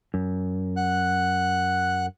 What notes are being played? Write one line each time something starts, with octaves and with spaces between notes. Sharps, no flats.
F#2
F#5 F#6